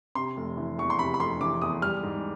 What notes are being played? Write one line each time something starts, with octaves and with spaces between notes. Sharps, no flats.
C3 C6
F1
E3
E2 C#6
C6
C3 B5
B5
F1 C6
E3 D6
E2 D#6
G3 F6
G#2